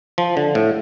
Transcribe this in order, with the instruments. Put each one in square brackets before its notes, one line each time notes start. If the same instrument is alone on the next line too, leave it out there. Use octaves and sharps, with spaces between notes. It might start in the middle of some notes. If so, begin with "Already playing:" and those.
[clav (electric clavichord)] F3
D3
A2